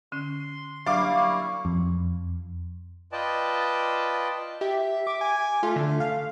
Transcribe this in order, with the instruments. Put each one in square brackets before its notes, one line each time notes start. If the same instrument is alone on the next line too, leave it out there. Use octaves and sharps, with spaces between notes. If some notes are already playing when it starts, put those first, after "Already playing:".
[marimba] D3 C#4 [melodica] C6
[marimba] F#3 D4 [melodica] G3 A#3 E4 [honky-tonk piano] F5 D6 [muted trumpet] C#6
[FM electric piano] F2
[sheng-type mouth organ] F4 B4 D5 D#5 G5 A5
[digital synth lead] G4 [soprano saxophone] E5
[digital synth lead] D6
[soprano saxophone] G#5
[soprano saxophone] A3 [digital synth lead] F4
[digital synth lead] D3
F5